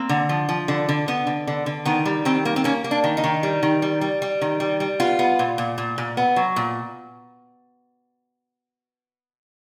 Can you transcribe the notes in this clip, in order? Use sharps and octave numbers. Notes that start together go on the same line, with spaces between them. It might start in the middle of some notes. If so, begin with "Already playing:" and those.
Already playing: A#3 C4
D3
F3
F3
D3
D3
D3 B3
D3
D3
D3
D#3 B3
G3
D#3 C4
A#3
C4
A#3 C#4
A#3
D4
D#3
D#4
D#3
G3
D#3
G3
G3
G3
D#3
G3
G3
B3 F4
B3
A#2
A#2
A#2
A#2
B3
F#3
A#2